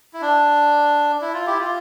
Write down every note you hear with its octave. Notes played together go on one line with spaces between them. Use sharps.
E4
D4
E4
F4
E4 G4
F4